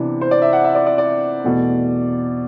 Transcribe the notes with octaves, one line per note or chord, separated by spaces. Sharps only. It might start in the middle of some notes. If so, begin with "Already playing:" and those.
Already playing: C3 E3 B3 D4
C5
D5
E5
F#5
E5
D5
D5
D5
E2 B2 A3